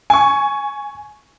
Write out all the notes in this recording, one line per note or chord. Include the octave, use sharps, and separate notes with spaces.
G#5 C#6